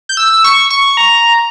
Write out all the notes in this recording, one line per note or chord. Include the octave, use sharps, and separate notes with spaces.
G6
E6
C#6
C#6
A#5